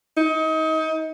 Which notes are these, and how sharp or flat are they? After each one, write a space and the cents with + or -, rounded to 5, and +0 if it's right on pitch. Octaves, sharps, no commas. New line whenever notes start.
D#4 +30